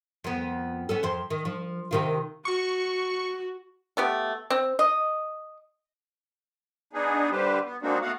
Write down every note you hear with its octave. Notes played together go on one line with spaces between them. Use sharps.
F2 B3
B3 C#4 A4
F2 C5
D#3
F3
C3 D#3 F4
F#4 C#6
A3 B3 G4
C4
D#5
B3 D4 D#4 G#4
D3 G3 G4 B4 C5
B3
G#3 A#3 C4 D4 D#4 F#4
A3 B3 F#4 F5 F#5